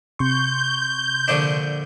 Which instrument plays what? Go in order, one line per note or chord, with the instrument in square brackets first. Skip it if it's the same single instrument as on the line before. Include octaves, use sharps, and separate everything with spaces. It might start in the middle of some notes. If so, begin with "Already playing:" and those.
[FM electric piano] C3 C6 C#6 [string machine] G6
[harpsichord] A#1 D3 D4